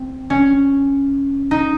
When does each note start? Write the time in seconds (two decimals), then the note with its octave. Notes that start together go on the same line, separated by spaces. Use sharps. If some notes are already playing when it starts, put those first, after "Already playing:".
Already playing: C4
0.30 C#4
1.51 D#4